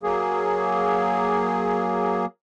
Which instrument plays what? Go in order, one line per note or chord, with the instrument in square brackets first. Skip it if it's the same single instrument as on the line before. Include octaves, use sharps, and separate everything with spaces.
[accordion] F#3 A#3 G#4